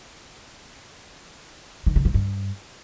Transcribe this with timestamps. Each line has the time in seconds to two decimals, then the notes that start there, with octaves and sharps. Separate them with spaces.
1.86 D#3
1.96 D3
2.05 F3
2.14 G2